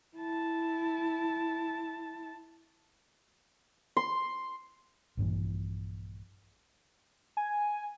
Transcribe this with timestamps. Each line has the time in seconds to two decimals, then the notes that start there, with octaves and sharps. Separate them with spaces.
0.17 E4 A5
3.97 C6
5.17 A#1 G2 A#2 E3
7.37 G#5